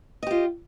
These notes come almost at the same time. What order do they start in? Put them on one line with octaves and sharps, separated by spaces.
D#5 G4 F4